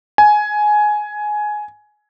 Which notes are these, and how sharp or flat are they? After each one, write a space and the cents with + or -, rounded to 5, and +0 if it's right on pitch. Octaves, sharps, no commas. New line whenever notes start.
G#5 +15